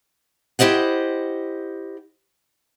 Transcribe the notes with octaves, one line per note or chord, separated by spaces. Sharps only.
E4 G4 C5 D#5 F#5